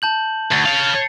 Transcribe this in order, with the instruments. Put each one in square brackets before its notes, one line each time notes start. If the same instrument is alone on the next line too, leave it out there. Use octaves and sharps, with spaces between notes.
[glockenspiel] A5 G6 F#7
[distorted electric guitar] D2 [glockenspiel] A6
[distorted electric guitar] C#5 F5